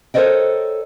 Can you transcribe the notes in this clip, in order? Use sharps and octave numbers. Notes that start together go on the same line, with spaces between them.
A4 A#4 C5 C#5 D#5 G5